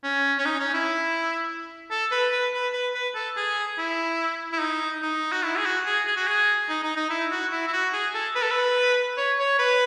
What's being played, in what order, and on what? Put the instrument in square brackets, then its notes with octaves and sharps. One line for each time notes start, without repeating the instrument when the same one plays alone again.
[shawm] C#4
C#4
D#4
C#4
E4
A4
B4
B4
B4
B4
B4
A4
G#4
E4
E4
D#4
D#4
F#4
E4
G#4
F#4
G#4
G#4
F#4
G#4
D#4
D#4
D#4
E4
F#4
E4
E4
F#4
G#4
A4
B4
A4
B4
C#5
C#5
B4